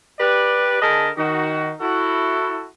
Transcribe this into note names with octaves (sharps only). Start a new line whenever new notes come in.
G4 B4 D5
D3 G#4 A#4 D#5 A5 B5
D#3 D#4 F#4
E4 F#4 A4